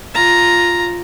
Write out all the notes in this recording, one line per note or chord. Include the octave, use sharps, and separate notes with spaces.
F4 A#5